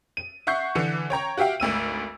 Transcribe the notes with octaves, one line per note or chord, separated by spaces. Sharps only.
D#7
E5 F#5 C#6 G6 C7
D3 E3 C#7
C#5 G5 A#5 C#6
F#4 G4 E5 F5 G5
G#1 D2 E6 D#7